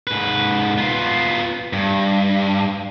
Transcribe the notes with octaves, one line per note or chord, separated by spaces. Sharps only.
G#2 B4
B3 F4
G2